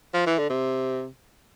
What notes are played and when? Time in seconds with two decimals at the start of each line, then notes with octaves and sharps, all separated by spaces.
0.14 F3
0.26 E3
0.39 D3
0.50 C3